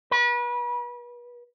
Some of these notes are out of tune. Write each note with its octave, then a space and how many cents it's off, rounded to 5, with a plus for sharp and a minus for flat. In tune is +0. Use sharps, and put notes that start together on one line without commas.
B4 -35